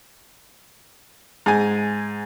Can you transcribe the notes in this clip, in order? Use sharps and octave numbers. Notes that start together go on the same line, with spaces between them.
G#2 G#5